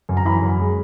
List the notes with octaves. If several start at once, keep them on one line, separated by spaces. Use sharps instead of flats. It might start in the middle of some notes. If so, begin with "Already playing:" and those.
F#2
A#5
E3 B5
F#2
G#3